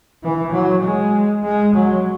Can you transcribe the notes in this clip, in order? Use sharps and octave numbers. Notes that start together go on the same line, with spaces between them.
E3
F#3
G#3
G#3
F#3